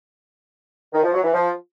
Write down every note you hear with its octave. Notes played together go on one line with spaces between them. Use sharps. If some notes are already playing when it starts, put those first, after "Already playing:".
D#3
F3
F#3
E3
F3